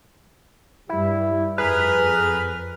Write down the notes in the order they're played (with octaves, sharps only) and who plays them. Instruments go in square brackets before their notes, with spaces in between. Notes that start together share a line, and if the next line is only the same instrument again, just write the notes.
[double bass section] G2 G3 [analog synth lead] E4
[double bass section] F2 [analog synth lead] G#4 [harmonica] A#4 F6 [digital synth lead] B4